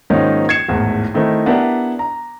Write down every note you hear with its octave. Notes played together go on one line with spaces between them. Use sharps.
G#2 D#3 F3 A#3 C#4 D#4
G#6 C7 C#7 E7
G#1 E2 A2
D#3 A3 C4 D#4 E4
B3 D4 E4 G4 A#4 E5
A#5